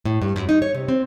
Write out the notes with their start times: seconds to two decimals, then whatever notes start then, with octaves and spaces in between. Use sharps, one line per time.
0.05 A2
0.22 G2
0.36 F#2
0.49 D#4
0.62 C#5
0.75 C3
0.88 C4